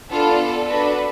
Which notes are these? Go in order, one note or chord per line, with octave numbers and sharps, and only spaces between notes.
B3 D4 F4 A4
D4 F#4 A4 B4